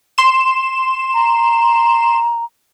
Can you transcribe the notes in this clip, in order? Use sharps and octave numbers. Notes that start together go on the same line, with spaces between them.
C6 E7
A#5